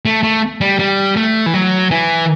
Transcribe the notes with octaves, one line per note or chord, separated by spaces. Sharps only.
A3
A3
G3
G3
A3
E3
F#3
E3